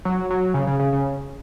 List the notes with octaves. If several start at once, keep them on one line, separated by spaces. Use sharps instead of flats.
F#3
F#3
C#3
C#3
C#3
C#3